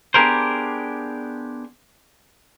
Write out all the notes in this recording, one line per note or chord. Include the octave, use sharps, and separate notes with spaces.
B3 D4 G4 G#4 A#4 C5